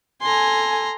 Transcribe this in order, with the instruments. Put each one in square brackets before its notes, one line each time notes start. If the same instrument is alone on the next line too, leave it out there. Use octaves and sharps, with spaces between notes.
[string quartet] A4 G#5 [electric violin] A#5 C6